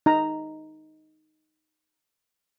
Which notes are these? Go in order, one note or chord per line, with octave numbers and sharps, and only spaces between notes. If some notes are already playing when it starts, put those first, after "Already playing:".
D#4 A#5